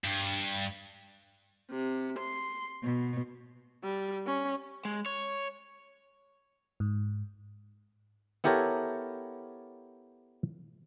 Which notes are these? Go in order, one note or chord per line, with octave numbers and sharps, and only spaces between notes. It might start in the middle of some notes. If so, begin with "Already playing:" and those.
G2
C3
C6
B2
G3
C#4
G#3
C#5
G#2
B3 E4 G4 A4 A#4 C#5